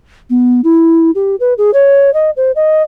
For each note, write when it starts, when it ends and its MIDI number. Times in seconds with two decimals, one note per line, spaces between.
0.30 0.61 59
0.64 1.11 64
1.15 1.36 67
1.40 1.54 71
1.58 1.71 68
1.74 2.13 73
2.14 2.30 75
2.37 2.52 72
2.56 2.82 75